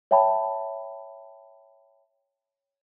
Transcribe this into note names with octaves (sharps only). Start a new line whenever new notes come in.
C#5 E5 G5 A5 B5